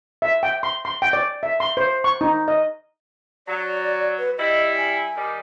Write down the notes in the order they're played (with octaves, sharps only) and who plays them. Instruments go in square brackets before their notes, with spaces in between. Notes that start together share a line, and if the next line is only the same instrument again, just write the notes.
[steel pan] E5
G5
C6
C6
G5
D5
E5
C6
C5
C#6
D#4
D#5
[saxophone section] F#3 [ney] D5
[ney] B4
[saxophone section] G3 E4 [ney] D#5
[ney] G#5
[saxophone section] D#3 G3